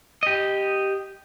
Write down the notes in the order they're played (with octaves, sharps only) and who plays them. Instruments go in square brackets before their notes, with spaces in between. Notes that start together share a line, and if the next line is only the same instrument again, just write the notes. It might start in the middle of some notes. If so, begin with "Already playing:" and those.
[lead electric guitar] G4 D#5